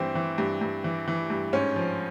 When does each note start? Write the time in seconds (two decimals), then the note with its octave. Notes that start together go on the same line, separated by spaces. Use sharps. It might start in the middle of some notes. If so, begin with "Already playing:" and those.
Already playing: G2 E3 C4
0.15 E3
0.38 G2
0.61 G2
0.84 E3
1.08 E3
1.30 G2
1.53 G#2 C#4
1.76 F3